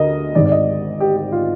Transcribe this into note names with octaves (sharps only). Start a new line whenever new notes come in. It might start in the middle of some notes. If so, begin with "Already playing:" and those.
Already playing: D2 D3 A#4 D#5
G#1 G#2 D#3 D5
D5
D#5
G4
G4
F4